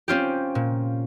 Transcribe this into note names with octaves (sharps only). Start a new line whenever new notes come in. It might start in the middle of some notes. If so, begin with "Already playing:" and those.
C4 C#4 F4 G4
A#2